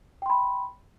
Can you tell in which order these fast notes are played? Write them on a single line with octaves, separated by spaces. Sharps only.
G5 C6 B5